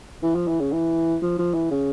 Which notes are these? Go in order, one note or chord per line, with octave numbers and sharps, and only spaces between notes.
E3
F3
E3
C#3
E3
F3
F3
E3
C#3